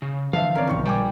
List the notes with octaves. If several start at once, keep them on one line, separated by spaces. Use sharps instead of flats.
C#3
D3 E3 F3 E5 F5 A5
C4 C#4 A#4 C#5 D5
D1 A#1 D#3 C#6
G3 G5 G#5 D6